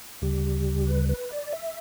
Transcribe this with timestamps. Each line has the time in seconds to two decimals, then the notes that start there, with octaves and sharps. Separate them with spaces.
0.22 D2 C#3 G3 G4
0.87 B4
1.09 B4
1.31 D5
1.53 E5